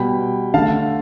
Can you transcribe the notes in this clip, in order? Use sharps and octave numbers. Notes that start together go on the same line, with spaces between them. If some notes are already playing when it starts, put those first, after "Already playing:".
Already playing: B2 G3 B3 G5 B5
D3 A3 F5 A5